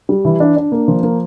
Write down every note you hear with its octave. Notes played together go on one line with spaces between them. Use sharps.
G3
E3
D4
D4
A#3
F3
A#3